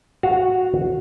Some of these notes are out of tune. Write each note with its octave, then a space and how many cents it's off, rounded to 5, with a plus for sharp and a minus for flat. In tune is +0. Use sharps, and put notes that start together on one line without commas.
F#4 -5 F5 +0